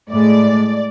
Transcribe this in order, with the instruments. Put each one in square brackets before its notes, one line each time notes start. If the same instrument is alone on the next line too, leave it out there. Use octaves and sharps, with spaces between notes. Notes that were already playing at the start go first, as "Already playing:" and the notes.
[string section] A2 G#3 D5